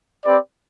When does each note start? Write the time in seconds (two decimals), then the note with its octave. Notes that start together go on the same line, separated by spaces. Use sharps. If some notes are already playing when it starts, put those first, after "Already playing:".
0.24 C4 G4 B4 D5